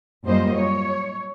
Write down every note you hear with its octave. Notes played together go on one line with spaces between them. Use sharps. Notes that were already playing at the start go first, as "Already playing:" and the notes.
F#2 G3 A#3 F4 C5 D#5
C#5